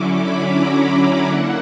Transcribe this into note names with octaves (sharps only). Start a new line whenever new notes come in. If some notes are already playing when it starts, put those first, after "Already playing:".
Already playing: D3 F#3 C#4 E4 D6
B5
A#5
D3 A#3 E4 F#5